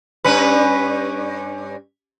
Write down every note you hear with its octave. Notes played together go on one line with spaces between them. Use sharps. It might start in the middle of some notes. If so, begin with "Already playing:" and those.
G2 C#4 B4